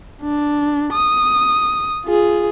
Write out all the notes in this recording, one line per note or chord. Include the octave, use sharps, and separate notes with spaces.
D4
D#6
F4 G#4